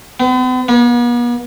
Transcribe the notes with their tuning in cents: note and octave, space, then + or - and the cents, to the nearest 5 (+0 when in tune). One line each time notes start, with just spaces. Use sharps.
B3 +45
B3 -45